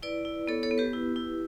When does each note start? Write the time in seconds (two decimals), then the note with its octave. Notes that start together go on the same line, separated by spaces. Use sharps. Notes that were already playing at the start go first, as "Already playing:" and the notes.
0.03 E4 B4 D5
0.25 E4
0.48 B3 A4 C#5
0.63 A4 C#5
0.71 B3
0.78 G4 B4
0.93 E4
1.16 E4